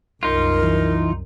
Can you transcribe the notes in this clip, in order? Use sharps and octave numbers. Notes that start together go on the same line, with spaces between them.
C2 F#2 D#4 F4 A#4
E3